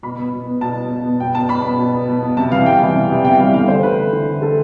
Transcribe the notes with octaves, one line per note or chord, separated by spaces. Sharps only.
B2 B5
B3
B2
B3
B2 A5
B3
B2
B3
B2 G5
B3 A5
B2 B5
B3
B2
B3
B2
B3
C3 A5
E3 G3 B3 F5
C3 G5
E3 G3 B3
C3
E3 G3 B3
C3 G5
E3 G3 B3 F5
D3 F5
A3 C5
D3 B4
A3
D3
A3
D3 A4